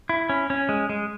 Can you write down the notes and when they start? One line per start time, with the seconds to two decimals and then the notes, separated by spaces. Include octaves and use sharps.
0.09 E4
0.29 C#4
0.50 C#4
0.69 G#3
0.90 G#3